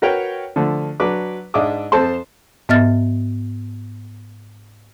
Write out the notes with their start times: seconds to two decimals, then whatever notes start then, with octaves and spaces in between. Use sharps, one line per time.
0.02 F#4 A#4 B4 C#5 G5
0.56 D3 F3 A3
1.00 F#3 D4 B4 D6
1.54 G#2 D4 D#5 E5 D6 D#6
1.92 F2 A4 C5 A5 C6
2.69 G#2 B3 D#5 E5 F6 A6